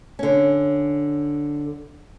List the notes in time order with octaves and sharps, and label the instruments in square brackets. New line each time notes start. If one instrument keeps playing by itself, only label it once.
[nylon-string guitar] D3 C#4